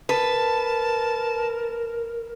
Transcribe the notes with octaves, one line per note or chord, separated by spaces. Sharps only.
A#4 B4 A5